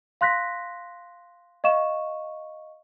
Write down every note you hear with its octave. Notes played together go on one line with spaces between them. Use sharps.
F5 C6 F#6 A#6 B6
D#5 F5 C#6 E7